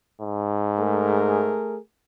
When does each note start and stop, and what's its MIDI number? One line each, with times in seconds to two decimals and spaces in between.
0.21 1.54 44
0.78 1.78 57
0.78 1.78 68
0.78 1.78 70